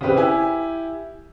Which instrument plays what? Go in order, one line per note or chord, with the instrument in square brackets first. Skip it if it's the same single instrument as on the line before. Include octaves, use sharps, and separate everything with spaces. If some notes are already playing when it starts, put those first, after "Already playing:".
[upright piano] C#3 C4 G4 B4
E4 G4 G#5